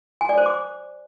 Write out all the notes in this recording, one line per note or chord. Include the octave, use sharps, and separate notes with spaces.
G#5
D5
C5
D6